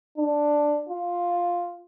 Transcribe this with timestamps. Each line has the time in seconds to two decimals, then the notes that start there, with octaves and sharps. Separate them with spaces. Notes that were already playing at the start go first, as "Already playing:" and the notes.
0.18 D4
0.89 F4